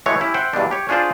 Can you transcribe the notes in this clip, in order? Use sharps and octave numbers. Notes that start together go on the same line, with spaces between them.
E3 F#3 G#3 A3 G4 C#5
C#4 E4 G4
C5 E5 F#5 G5
E2 G2 B2 D4
G4 C#5
C#4 D4 F4 G#4 C5 D5